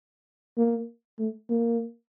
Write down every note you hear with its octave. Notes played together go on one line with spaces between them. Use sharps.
A#3
A3
A#3